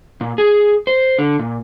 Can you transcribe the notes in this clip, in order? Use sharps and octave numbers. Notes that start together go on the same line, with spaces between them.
A#2
G#4
C5
D3
A#2